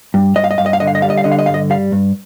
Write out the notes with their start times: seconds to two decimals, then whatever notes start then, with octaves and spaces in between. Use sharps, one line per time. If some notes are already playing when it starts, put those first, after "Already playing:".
0.14 G2
0.36 G2 D#5
0.44 F5
0.51 D#5
0.58 G2 F5
0.66 D#5
0.73 F5
0.80 D3 D#5
0.87 F5
0.95 D#5
1.02 G3 F5
1.10 D#5
1.18 F5
1.24 D3 D#5
1.32 F5
1.39 D#5
1.46 G2 F5
1.54 D#5
1.70 G3 F5
1.92 G2